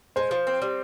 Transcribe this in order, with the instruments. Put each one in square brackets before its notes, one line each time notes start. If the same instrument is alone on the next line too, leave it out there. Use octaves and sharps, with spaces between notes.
[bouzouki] G#3 [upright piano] C5
[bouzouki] F3
C4
G3